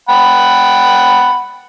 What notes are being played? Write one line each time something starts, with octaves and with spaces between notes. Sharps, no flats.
F#5 G5 B5